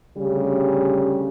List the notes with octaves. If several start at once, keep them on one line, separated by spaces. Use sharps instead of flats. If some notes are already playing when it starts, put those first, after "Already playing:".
D2 C#3 G3 G4